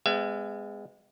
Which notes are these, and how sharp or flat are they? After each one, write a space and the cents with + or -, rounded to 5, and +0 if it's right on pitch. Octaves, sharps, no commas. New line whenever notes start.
G#3 -10 B3 +35 E5 +40